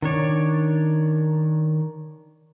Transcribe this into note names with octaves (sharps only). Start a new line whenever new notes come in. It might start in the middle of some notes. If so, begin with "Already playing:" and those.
D#3 D4 C#5 D5